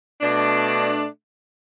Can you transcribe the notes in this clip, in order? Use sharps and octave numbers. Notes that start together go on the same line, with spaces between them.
B2 A3 D4